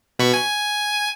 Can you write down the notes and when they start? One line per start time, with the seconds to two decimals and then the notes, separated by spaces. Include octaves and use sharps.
0.19 B2 B5 C#6
0.34 G#5